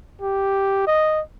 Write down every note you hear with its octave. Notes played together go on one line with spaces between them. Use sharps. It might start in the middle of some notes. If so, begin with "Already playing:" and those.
G4
D#5